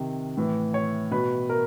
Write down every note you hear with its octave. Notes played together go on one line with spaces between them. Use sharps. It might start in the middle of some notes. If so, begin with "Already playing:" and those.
Already playing: C3 D#3
A2 E3
C#5
B2 B4
A#4